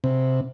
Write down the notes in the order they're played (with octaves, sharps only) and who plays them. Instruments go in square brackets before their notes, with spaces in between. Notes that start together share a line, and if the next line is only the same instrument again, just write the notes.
[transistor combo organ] C3